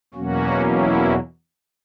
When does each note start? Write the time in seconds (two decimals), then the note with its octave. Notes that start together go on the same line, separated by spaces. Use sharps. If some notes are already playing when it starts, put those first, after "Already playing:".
0.14 E2 B2 F#3 A#3 C#4 F#4
0.67 E4